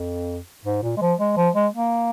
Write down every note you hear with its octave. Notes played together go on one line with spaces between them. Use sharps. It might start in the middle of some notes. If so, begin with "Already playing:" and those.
Already playing: F2
G#2
A#2
G#3
F3
G#3
F3
G#3
A#3